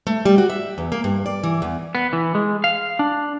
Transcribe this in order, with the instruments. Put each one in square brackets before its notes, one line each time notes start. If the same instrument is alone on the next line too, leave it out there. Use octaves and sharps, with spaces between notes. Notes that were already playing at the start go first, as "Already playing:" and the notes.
[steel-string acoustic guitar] A3
G3
F#4
E5
E2
A#3
G2
D5
E3
E2
[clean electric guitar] B3
E3
G#3
F5
D4